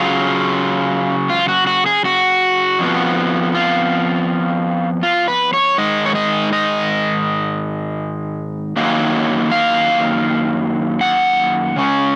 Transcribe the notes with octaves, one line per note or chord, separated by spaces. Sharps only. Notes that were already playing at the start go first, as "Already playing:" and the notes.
Already playing: C#3 F#3 C#4 F4
F4
F#4
F#4
G#4
F#4
F2 F3 B3
F4
F4
B4
C#5
G#2 D#3 G#3 D#5
C#5
D#5
D#5
F#2 D#3 F#3 A#3 C#4
F5
F#5
C#3 G#3 C#4